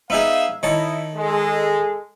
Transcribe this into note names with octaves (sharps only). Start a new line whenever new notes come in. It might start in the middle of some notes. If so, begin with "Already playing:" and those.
B3 D#4 G#4 E5 F5
D#3 E4 C#5 D#5 A5
G#3 A4